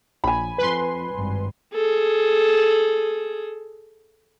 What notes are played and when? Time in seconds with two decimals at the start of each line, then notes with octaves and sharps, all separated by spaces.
0.24 A#1 G#5 B5
0.58 F2 B4 C6
1.13 G#1 G2
1.75 G#4 A4